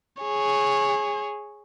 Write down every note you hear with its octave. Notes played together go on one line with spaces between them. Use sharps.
G#4 C#5